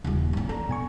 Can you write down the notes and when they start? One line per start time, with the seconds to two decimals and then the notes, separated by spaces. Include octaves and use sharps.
0.04 D#1 C#3 G3 F4
0.33 F#3 C#4
0.49 D4 A4 A#5
0.69 B2 G#5 C#6